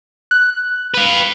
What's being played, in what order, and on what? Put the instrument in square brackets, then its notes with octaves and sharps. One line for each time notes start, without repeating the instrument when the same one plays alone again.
[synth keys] F#6
[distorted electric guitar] B4 F5